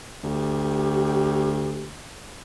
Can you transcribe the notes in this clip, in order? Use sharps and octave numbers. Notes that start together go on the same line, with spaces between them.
D2 G4